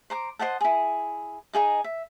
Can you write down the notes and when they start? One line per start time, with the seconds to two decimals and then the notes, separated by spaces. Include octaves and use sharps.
0.10 C5 A#5 D6
0.39 C5 D#5 F#5 A5
0.61 E4 G#4
1.53 D#4 F#4 G#4 D#5
1.84 E5